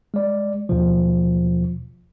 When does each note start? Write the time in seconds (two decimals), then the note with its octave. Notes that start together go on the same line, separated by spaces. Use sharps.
0.14 G#3 D5
0.69 D#2 B2 F3